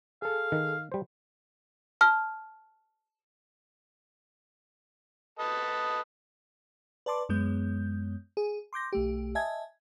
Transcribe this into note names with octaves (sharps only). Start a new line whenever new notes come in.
G#4 A4 F5
D#3
G3 C5
A5 F6
A4 B4 D#5
B4 D5 A5 C6 D6
F#2 G#3 B3 G6
G#4
C6 D6 G6 A#6
B1 A3 G4
D#5 E5 G#5 A5 G#6